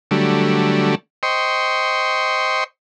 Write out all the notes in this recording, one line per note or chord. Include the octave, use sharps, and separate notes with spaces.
D3 F#3 G3 A3
C5 D#5 G5 C6 C#6